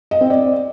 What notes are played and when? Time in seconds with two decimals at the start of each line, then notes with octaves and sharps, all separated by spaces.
0.11 D#5
0.21 C4
0.30 D5